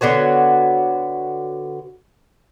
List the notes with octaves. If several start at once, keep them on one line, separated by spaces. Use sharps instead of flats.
D3 B3 F#4 C#5